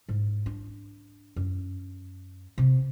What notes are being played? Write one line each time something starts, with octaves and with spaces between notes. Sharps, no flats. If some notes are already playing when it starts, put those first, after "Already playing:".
G#2
D4
F#2
C3